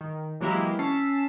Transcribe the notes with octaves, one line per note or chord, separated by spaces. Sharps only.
D#3
E3 F#3 G#3 A#3 E4 G4
C#4 A5 E6 B6 C7